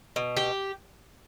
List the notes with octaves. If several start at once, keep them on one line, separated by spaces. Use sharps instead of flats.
B2
G4